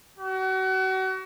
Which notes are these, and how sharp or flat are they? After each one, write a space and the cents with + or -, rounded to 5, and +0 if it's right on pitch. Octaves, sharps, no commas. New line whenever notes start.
F#4 +35